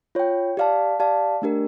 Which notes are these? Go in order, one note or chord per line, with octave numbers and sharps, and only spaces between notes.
F4 C#5 G5
G4 D5 F5 A5
G4 D5 F5 A5
A3 D4 G4 A#4